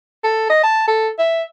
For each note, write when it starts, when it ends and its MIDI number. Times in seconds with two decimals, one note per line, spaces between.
0.24 0.45 69
0.50 0.63 75
0.64 0.84 81
0.87 1.09 69
1.19 1.43 76